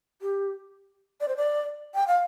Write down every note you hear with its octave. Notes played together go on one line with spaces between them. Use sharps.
G4
D5
C5
D5
G5
F5